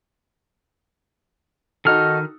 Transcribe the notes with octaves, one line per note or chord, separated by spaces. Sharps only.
D#3 D#4 F#4 A4 F6